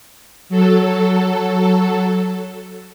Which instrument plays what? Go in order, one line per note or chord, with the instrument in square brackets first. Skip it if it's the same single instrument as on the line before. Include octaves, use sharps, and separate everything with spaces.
[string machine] F#3 A4